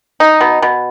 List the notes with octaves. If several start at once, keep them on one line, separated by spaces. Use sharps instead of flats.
D#4
B2
B2